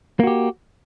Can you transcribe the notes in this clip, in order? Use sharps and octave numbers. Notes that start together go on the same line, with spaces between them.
A#3 F#4 G4